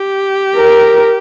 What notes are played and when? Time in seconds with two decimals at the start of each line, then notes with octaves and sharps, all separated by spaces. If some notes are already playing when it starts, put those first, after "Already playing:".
Already playing: G4
0.56 A#4